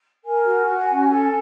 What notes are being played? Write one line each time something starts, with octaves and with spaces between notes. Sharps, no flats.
A#4 G#5
F#4
F#4
C#4
A4